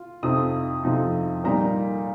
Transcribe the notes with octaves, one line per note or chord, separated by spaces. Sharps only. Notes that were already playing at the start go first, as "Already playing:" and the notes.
Already playing: F4
F2 C3 F3 D#4 D#6
F2 C3 F3 D#4
A#2 G3 A#3 D#4 A#5